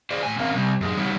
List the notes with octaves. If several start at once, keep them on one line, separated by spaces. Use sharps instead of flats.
G#4 C5 D5
A2 G#5
G#3 C4 C#4 A#4 F5
C3 G3
F#2 G#3
G3 D#4 F#4 B4 C#5